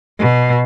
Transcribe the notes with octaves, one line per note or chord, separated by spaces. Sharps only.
B2